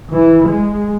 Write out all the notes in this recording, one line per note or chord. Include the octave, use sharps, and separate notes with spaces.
E3
G#3